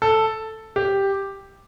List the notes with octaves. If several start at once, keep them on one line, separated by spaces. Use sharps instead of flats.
A4
G4